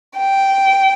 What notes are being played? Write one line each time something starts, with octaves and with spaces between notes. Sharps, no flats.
G5